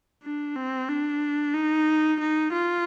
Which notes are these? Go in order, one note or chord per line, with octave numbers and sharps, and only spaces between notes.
D4
C4
D4
D#4
D#4
F4